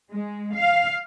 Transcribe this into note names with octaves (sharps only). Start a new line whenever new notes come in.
G#3
F5